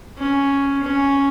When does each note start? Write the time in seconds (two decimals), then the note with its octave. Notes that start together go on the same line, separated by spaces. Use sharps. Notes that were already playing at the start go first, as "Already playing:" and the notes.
0.18 C#4
0.84 C#4